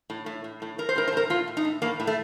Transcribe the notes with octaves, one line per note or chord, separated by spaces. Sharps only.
A2
A2
A2
A2
A2 A#4
C5
A2 A#4
C5
A2 A#4
A2 F4
A2
D#4
A2
A2 A#3
A2
A3